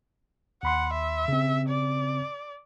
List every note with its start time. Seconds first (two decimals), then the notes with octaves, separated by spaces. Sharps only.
0.63 D#2 F#5 B5 C6
0.93 E5
1.28 C#3 C4
1.69 D5